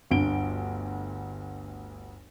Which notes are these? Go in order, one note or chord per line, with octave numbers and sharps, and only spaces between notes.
G1 D2 D7 G7